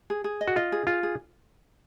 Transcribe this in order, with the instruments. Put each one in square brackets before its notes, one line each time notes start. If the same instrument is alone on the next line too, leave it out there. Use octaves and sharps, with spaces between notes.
[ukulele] G#4
G#4
D#5
[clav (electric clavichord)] F#4
[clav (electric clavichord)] F4 [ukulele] D#5
[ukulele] G#4
[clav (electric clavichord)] F4 [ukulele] G#4
[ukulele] G#4